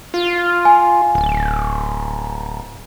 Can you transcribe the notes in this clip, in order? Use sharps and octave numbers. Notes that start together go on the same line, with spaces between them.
F4
G#5
D1